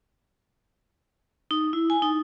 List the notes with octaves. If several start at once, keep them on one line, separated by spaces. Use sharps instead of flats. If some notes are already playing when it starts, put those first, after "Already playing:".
D#4
E4
G#5
D#4